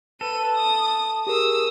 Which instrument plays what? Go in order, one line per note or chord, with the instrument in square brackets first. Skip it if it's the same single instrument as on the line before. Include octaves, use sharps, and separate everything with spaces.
[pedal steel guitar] A4 [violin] B4 D#7
[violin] D#6
[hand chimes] G4 G#4 A#4 [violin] D#6 E6